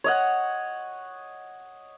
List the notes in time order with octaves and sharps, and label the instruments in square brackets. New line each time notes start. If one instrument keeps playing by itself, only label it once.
[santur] C#5 D#5 F#5